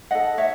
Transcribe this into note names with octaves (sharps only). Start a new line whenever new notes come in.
D#4 A4 D#5 F#5
C#5 E5